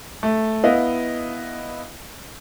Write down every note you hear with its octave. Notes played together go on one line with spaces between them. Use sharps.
A3
B3 E4 D#5 F5